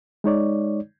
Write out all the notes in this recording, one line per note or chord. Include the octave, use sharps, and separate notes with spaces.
G#3 D#4 C#5 D5